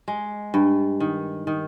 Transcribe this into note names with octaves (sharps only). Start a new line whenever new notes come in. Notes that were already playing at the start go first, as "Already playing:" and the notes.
G#3
G2
D#3
D#3